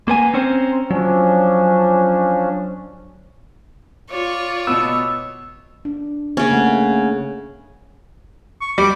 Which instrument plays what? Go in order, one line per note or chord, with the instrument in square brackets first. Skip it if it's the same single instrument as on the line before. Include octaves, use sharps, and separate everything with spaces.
[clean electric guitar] A#3 B3 G#5 [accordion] A#5 C6
[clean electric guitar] C4 C#4 C5
[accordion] F3 C#4 D4 [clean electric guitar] F#3
[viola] F4 D5 [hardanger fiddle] C#5
[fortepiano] B2 B3 [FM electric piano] E6
[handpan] D4
[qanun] C#3 C#4 [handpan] A#3
[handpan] A3 F#5
[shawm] C#6
[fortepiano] G3 [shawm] D6